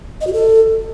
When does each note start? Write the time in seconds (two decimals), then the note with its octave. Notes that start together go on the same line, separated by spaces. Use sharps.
0.21 D#5
0.27 F#4
0.33 A4